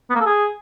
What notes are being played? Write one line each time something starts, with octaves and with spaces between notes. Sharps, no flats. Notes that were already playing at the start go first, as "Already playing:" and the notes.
B3
A#3
A4
G#4